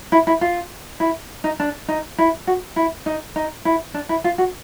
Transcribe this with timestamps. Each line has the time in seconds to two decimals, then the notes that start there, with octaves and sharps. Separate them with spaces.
0.12 E4
0.27 E4
0.41 F4
1.00 E4
1.44 D#4
1.60 D4
1.88 D#4
2.18 E4
2.47 F#4
2.76 E4
3.06 D#4
3.36 D#4
3.65 E4
3.94 D4
4.09 E4
4.24 F4
4.38 F#4